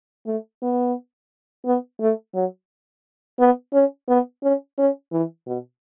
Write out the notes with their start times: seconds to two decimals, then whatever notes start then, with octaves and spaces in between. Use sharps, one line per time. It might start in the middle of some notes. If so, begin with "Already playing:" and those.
0.26 A3
0.62 B3
1.65 B3
2.01 A3
2.34 F#3
3.39 B3
3.73 C#4
4.09 B3
4.43 C#4
4.78 C#4
5.12 E3
5.47 B2